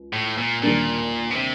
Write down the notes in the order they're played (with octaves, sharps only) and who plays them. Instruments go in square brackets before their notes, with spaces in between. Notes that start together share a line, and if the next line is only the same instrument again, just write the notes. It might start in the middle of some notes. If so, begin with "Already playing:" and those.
Already playing: [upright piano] C#2
[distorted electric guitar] A2
A#2
[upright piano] D#2 D3 G3 A#3 D4 [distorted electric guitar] A#2
[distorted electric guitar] B2
C3